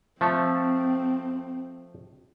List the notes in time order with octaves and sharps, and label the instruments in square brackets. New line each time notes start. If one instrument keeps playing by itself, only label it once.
[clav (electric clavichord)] F3 A3 A4 [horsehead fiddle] C4